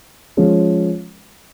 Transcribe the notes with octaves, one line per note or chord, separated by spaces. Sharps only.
F3 G#3 C#4